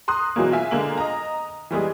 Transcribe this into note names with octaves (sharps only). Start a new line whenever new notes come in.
A#5 C6 D#6 F#6
B2 E3 F#3 G#3 A#3
F4 E5 G#5
D3 G#3 A#3 F#7
D#5 A#5
E3 G3 G#3 G#4